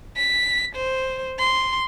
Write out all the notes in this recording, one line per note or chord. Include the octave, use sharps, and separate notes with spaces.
B6
C5
C6